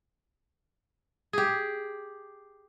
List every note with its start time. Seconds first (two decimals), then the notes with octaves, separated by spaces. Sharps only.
1.33 G4 G#4